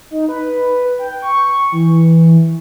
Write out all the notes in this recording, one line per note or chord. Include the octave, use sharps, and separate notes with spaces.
D#4
B4
G5
C#6
E3